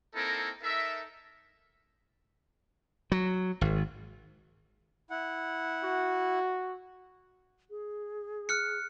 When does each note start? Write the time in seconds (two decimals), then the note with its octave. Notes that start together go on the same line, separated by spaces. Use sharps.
0.15 A#3 C4 D#4 E4 A4 A#4
0.63 D#4 A4 A#4 E5
3.12 F#3
3.61 G#1
5.10 E4 F#5
5.84 F#4
7.70 G#4
8.49 F6 F#6 C#7